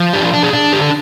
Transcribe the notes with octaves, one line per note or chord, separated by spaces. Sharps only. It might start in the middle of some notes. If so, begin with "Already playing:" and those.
Already playing: F3
D4 G4
D4
G#4
D4
D3 G4